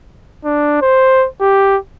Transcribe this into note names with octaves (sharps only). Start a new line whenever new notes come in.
D4
C5
G4